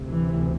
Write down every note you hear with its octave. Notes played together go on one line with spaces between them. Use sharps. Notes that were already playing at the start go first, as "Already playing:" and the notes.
Already playing: D2 C3
E3